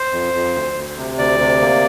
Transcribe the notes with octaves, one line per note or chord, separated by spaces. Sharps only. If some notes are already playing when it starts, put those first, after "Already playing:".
Already playing: C5
F2
F2
D2
D2
C3
D2 D5
C3
A#3